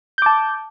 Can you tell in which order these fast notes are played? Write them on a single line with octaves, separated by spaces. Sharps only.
G6 D6 A5